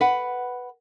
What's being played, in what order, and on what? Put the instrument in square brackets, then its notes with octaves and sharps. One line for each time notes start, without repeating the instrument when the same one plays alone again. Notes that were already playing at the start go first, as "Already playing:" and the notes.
[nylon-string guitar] B4 F#5